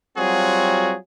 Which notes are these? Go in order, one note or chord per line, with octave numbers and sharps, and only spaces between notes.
F#3 G3 C4 F4 F#4 G#4